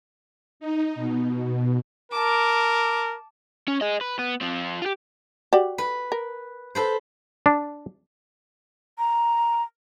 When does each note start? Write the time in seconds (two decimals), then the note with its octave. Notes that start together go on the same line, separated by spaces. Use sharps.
0.60 D#4
0.95 B2
2.12 A#4 A5 D6
3.68 C#4
3.81 G#4 D#5
4.01 B4
4.19 B3
4.41 C4 F4
4.82 F4 G4
5.53 F#4 G4 D5
5.78 B4
6.12 A#4
6.75 A4 B4 C5
7.46 D4
8.99 A#5